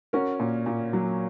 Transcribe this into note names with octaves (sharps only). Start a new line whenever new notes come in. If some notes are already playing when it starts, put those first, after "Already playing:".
C#4 F#4 A#4
A#2
A#2
F#3